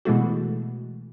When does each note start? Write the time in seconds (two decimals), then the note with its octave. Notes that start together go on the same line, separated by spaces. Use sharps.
0.05 B2 E3 G#3 A3 F#4